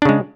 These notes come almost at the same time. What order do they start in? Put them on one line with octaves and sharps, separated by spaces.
D4 C#3 G#3